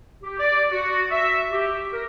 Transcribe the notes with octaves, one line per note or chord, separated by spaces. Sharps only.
G4
D5
F#4
E5
G4
A#4